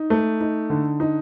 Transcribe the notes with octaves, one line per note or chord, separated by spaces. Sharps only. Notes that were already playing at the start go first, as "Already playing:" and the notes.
Already playing: D#4
A3
D#4
D3
D#4